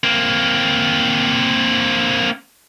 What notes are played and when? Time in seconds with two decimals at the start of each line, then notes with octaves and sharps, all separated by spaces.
0.04 A#3 C4